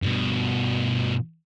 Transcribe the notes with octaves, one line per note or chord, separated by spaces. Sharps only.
G2 B2